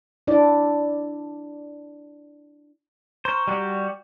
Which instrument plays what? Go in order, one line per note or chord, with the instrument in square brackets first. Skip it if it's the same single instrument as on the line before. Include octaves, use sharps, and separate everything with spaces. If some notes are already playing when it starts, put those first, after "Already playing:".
[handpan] D4 E4 D5
[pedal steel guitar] C5 [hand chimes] A#5 C#6 F6
[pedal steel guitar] G3 F#4 G4 [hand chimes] D5